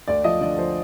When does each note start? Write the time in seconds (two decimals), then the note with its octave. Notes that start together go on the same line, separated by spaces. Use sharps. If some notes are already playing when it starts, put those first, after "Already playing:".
0.08 D2 D5
0.24 F3 D#5
0.41 D3 D5
0.57 F3 C5